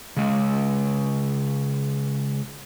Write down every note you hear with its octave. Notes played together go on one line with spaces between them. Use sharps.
C#3 G#3